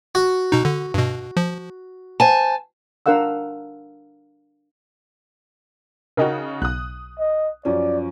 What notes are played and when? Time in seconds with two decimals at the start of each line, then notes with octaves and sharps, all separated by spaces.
0.15 F#4
0.52 B2 D#4
0.65 D3
0.94 G2 B2
1.37 F3
2.20 C5 G#5 A5
3.06 D4 A#4 F5 F#5 E6
6.17 C#3 D#4 F#4 A#4 D#5 G5
6.62 B1 D#6 F#6
7.19 D#5
7.65 F#2 F3 C#4 D5